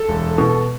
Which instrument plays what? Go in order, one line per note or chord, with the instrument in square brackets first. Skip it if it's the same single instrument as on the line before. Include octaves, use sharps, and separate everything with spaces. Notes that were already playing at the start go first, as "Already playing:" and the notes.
Already playing: [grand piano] A4
E1
B2